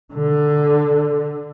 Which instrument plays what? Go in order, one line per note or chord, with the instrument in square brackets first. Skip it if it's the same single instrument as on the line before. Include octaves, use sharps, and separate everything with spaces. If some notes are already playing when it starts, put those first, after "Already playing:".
[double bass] D3